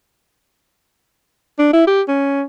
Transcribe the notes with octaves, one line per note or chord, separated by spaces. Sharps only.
D4
E4
G4
C#4